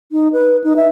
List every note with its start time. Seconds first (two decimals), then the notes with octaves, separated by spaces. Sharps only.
0.12 D#4
0.33 B4
0.64 D#4
0.76 E5